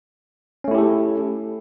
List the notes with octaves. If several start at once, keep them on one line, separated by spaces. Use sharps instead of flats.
A3 C#4 E4 G4 A4